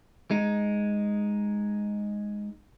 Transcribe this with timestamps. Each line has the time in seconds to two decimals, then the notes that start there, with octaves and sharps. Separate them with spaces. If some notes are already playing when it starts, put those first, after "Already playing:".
0.31 G#3 D#4